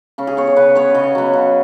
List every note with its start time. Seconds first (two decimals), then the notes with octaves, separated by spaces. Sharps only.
0.18 C#3 C#4
0.27 G#4
0.37 B3 C#5
0.47 C#5
0.56 C#3 B4
0.75 B3 C#5
0.95 C#3 D#5
1.15 F#3 B3
1.33 C#3